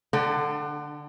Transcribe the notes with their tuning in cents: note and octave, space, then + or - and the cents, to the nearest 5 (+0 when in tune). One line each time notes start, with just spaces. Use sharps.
D3 +5 D4 +35 G5 -25